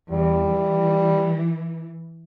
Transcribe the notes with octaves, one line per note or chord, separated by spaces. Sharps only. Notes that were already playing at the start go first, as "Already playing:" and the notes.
E2 G3
E3